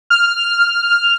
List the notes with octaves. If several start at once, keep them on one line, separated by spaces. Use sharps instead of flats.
F6